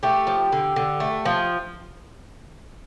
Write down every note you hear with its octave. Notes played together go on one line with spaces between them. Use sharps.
A3 G4
F3
D3
D3
A3
F3